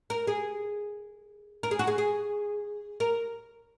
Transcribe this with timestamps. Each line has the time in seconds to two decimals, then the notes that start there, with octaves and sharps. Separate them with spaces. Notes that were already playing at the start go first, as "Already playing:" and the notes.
0.10 A#4
0.27 G#4
1.63 A#4
1.71 G#4
1.79 F#4
1.87 G#4
1.98 G#4
3.00 A#4